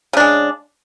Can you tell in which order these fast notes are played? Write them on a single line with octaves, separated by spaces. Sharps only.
C#3 D4 G#3